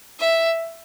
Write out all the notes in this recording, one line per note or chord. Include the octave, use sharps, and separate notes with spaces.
E5